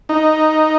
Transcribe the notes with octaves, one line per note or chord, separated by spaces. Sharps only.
D#4